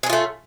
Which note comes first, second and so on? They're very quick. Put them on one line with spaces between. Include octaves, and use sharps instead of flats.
G#4 C#4 F4 A3